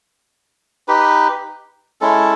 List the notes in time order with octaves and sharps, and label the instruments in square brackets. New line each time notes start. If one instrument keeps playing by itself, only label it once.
[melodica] D#4 G4 B4
G#3 C#4 E4 A4